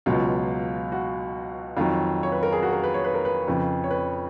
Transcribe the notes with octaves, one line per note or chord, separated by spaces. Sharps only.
C#2 B2 F#3 F4
F#4
F2 D#3 F#3 F4
C#5
B4
A#4
G#4
F#4
A#4
B4
C#5
B4
A#4
B4
F2 C#3 F3
C#5
B4